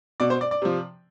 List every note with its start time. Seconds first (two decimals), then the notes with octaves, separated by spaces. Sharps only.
0.20 B2 D5
0.30 C5
0.41 D5
0.51 D5
0.62 C3 F3